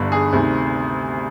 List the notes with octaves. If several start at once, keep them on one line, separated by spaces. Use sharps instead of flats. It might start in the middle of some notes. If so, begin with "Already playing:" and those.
Already playing: G1 G2 D3
G#4
D2 C3 D#3